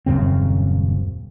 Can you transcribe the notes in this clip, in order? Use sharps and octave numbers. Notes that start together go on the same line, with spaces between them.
D#1 F#2 C#3 C4